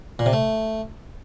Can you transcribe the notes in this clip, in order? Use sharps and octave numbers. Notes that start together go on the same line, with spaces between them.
A#2
C3
A3